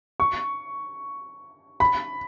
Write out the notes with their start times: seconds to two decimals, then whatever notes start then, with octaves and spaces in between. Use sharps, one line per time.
0.20 C#6
1.80 B5